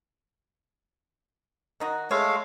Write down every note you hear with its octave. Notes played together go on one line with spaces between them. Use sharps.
D#3 D#4 F#4
G#3 A3 C#5 F5